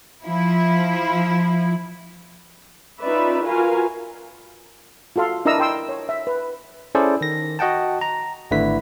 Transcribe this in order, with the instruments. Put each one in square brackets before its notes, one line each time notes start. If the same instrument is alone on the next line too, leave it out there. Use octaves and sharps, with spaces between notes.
[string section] F3 E4
[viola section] C#4 D#4 F4 B4 D5 E5
F4 F#4 A#4 B4 F5 G#5
[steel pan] F4 F#4 A4 F5 C6
D4 E4 A#4 D#5 A#5 E6
A#4 G5 C6 E6
C#5
E5
B4
[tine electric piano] C#4 E4 G#4 A4 C5 D5
D#3 A#6
F#4 D#5 F#5 G5 A5
A#5
G#1 D3 A3 E4 B4 B6